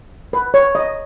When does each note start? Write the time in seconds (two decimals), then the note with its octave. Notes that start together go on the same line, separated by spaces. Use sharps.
0.33 B4
0.54 C#5
0.75 D#5